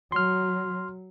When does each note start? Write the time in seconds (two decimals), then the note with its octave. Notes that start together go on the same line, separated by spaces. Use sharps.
0.12 F#3 C6 F6